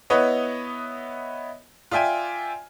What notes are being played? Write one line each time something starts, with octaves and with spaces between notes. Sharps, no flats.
B3 E4 B4 C#5 D#5
F4 D5 E5 G5 G#5